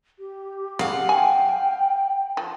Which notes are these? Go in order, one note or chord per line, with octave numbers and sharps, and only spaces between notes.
G4
C#3 F5 F#5
G5 G#5
F3